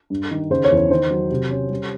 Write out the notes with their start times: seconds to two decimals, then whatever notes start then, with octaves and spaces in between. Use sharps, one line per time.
0.10 G2
0.31 D#3
0.50 C#3 C5
0.64 C#5
0.71 E2
0.77 C#5
0.90 D#3 C5
1.11 F#3
1.31 C3
1.51 C#4
1.70 G3